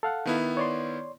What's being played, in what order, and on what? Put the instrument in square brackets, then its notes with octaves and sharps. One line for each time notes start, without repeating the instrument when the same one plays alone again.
[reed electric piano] A4 F5 F#5
[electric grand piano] D#3 B3 E4
[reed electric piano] C#5 D5 C6